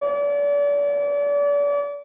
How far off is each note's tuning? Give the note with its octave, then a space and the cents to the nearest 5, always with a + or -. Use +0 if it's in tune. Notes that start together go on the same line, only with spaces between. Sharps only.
D5 -35